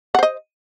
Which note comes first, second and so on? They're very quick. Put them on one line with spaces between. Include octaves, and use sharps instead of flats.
F#5 C5 D#5